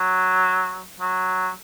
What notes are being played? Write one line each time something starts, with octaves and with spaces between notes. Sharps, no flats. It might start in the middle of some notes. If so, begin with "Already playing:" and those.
Already playing: F#3
F#3